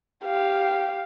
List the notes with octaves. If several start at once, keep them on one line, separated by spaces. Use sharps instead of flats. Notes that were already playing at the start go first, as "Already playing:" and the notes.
G4 F5